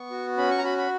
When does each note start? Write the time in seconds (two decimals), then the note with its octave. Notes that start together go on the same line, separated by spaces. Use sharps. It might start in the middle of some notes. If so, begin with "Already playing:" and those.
Already playing: B3 C#6
0.10 F#4
0.37 C#4 B5
0.51 C#6
0.58 A#5
0.64 F#4 B5
0.78 B5